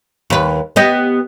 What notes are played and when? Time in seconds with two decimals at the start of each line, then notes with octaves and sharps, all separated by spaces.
0.30 D#2 B4
0.76 B3 G4 D#5